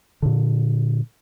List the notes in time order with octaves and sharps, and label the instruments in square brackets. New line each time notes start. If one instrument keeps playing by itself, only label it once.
[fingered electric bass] A#2 D3